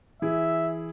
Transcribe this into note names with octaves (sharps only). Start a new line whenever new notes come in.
E3 E4 G#4 E5